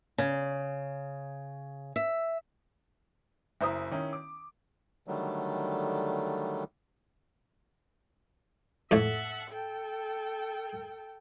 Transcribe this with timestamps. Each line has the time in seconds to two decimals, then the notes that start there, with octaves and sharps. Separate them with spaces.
0.18 C#3
1.96 E5
3.61 F#1 E4 C5 A#5 D#6
3.91 D#3 C#4 E4
4.13 D6
5.07 D3 D#3 F#3 G3 A3
8.91 F2 A2 A3 E5 F#5 A5
9.50 A4 G5